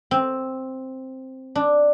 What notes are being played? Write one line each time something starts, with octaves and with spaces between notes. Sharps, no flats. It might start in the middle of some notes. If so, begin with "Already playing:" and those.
C4
D4